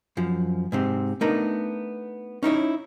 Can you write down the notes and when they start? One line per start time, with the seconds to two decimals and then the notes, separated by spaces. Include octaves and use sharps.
0.17 F#2 F3
0.72 G#2 C3 C4
1.21 A3 B3 D4 D#4 A#4
2.43 C#4 D#4 E4 C#5